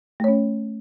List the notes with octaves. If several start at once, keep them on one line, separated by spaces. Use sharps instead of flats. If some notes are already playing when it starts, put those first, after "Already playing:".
A3 C#4 C#5